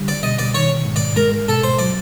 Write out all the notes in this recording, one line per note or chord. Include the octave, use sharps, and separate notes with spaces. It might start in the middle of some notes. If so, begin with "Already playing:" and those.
Already playing: D3 G3
D5
B2 D#5
D5
D#3 C#5
G#2
D5
G#3 A#4
B2 A4
C5
F#3 D5